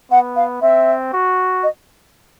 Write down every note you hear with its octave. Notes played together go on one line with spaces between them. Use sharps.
B3 F#5
F5
C4 E5
F#4
D#5